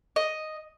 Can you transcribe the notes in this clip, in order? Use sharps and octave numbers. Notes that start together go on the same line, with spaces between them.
D#5